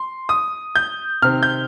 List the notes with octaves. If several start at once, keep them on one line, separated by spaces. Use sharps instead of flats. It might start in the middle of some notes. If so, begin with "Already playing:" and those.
Already playing: C6
D#6
G6
C3 D#3 C4 F6
G6